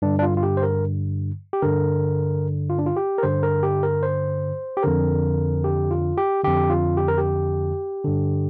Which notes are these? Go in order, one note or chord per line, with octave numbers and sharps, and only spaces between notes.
G2 D3 D4
D4
F4
F4
G4
C5
A#4
G4
G2 D3 A#4
F4
D4
F4
G4
A#4
G2 D3 C5
A#4
G4
A#4
C5
G4
F2 D3 A#4
G4
F4
G4
F2 D3 G4
F4
G4
A#4
G4
G2 D3